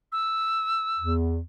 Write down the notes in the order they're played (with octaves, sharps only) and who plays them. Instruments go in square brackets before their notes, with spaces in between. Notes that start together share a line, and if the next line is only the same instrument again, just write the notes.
[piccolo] E6
[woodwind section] E2